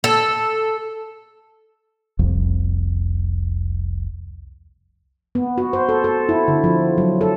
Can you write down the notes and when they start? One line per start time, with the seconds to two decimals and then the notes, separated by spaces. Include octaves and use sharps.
0.04 A4
2.19 F1 C2 F2
5.35 B3
5.58 F#4
5.73 C5
5.89 A4
6.04 A4
6.29 E4
6.48 D3
6.64 F3
6.98 F#3
7.21 A4